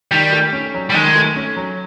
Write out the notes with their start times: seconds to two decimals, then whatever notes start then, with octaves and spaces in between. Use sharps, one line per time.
0.11 D#3 G3
0.33 A3
0.53 C#4
0.74 F#3
0.90 G3
0.95 D#3 G#3
1.16 A3
1.36 C#4
1.56 F#3